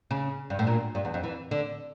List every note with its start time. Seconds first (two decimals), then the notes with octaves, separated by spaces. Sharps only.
0.11 C#3
0.50 G2
0.59 A2
0.67 A#2
0.95 G2
1.05 E2
1.14 F2
1.24 E3
1.51 D3